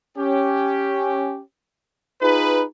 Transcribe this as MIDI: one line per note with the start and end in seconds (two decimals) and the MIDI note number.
0.17 1.41 61
0.17 1.41 67
2.22 2.64 63
2.22 2.64 65
2.22 2.64 68
2.22 2.64 71